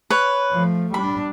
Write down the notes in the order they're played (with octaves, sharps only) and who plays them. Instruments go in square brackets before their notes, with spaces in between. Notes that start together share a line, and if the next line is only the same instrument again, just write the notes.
[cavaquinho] B4 C#5
[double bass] F3 A3
[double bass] G3 D4 [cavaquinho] B5